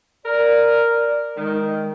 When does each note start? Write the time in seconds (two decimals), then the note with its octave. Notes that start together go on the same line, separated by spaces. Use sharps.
0.25 A#4 D5
1.37 D#3 G#3